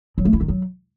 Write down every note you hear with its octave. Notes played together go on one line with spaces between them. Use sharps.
F#3
A3
E4
D#3
F#3